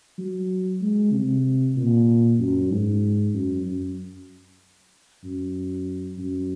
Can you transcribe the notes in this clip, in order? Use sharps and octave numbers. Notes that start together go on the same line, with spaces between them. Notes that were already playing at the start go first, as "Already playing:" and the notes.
F#3
G#3
C3
A#2
F#2
G#2
F#2
F#2
F#2
F#2